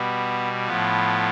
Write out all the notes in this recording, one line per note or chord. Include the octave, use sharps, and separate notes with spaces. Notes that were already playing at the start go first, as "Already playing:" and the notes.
Already playing: B2 G3 B3
A2 F3 B3